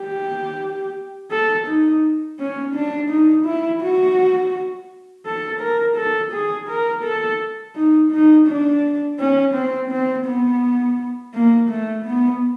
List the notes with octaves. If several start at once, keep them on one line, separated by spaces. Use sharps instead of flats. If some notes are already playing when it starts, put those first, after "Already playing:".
Already playing: G4
A4
D#4
C#4
D4
D#4
E4
F#4
A4
A#4
A4
G#4
A#4
A4
D#4
D#4
D4
C#4
C4
C4
B3
A#3
A3
B3